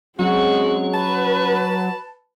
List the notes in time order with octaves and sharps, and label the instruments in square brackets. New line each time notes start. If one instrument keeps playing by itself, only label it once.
[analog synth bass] F#3 [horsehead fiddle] G#3 C4 [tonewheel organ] C#4 [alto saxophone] F#4
[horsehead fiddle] B4 [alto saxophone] A5